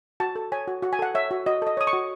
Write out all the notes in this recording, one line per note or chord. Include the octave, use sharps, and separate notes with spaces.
F#4 A5
A4
C#5 G#5
F#4
F#4 F#5
G#5
A4 F#5
C#5 E5
F#4
F#4 D#5
A4 D#5
C#5 D#6
C#6
F#4